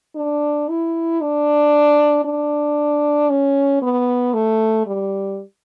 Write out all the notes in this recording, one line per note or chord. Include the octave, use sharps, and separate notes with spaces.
D4
E4
D4
D4
C#4
B3
A3
G3